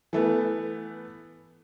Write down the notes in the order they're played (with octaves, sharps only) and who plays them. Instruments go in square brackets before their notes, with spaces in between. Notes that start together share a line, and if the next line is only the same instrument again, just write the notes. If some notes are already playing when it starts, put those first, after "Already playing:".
[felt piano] E3 A3 B3